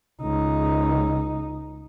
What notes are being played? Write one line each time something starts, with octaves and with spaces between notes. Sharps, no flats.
C#2 D#4